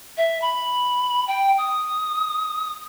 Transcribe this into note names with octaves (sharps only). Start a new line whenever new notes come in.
E5
B5
G5
D#6